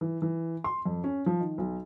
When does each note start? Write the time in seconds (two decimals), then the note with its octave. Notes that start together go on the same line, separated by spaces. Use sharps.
0.01 E3
0.22 E3
0.64 C6
0.85 F2
1.04 C#4
1.26 F3
1.40 D#3
1.58 B1